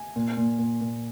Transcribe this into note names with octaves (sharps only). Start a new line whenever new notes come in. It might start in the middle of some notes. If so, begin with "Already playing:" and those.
Already playing: G#5
A#2
A#2
A#2
A#2